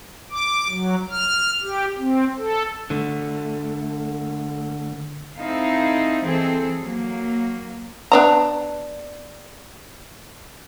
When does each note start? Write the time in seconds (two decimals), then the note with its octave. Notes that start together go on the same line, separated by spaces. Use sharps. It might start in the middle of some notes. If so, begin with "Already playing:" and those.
0.31 D6
0.68 F#3
1.10 F6
1.63 G4
1.98 C4
2.37 A4
2.90 D3 A3
5.38 C4 D#4 E4 A4 F5
6.23 E3 C4 G#4 A4
6.80 F#3 A#3
8.12 B3 D4 A#5